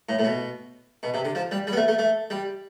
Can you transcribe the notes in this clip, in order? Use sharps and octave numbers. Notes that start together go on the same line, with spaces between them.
A2
A2
B2
B2
C3
D3
F3
G3
G3
B3
A3
A3
A3
G3